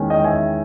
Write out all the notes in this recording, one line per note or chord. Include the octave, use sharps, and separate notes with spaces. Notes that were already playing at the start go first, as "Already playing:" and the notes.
Already playing: E2 D#3 G#3 C#4
D#5 G5
E5 G#5